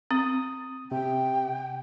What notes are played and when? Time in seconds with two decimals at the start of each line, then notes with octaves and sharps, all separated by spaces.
0.11 C4 D#6
0.91 C3 G5